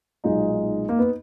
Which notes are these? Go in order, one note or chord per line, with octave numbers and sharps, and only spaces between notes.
B1 A#2 G#3 D#4
A#3
B3